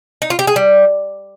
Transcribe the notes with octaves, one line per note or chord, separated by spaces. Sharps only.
D#4
F4
G4
G#4
G3